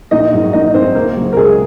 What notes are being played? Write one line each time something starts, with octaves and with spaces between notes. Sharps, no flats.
A#1 D#4 D#5
G#2 D#3 F#3
A#1 D#4 D#5
G#2 D#3 F#3 C4 C5
C#2 A#3 A#4
C#3 F#3
A#4
C#2 G#3 G#4